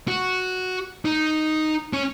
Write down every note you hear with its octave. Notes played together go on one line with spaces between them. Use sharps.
F#4
D#4
C#4